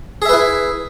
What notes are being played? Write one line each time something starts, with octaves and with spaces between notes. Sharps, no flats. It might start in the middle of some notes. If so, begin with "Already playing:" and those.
E4 G#4 B4 E5